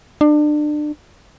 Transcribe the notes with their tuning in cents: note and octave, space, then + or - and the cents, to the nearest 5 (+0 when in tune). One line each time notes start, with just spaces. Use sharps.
D4 +30